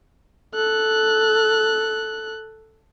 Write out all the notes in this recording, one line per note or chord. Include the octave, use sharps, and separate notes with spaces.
A4 F#6